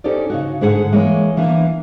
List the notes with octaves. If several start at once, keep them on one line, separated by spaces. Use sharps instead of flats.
C#4 D#4 G4 A4 C5 D5
C#3 D#4 F#4
G#2 D3 G#4 F#5
E3 G#3 A#3 C#5
E3 A#3 D4